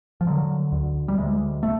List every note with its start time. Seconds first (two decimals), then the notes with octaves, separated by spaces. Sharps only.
0.21 F3
0.27 D3 F#3
0.72 D2
1.08 G3
1.17 D2 G#3
1.63 A3